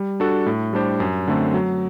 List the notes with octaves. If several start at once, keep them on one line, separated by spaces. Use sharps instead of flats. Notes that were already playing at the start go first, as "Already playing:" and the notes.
Already playing: G3
D4 F#4 A4
A2
G3 D4 G4 C5
F#2
D3 A3 C4
F#3